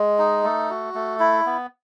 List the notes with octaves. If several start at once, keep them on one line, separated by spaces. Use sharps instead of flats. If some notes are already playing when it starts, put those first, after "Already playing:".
Already playing: G#3
D#4
A3
F#4
A3
E4
B3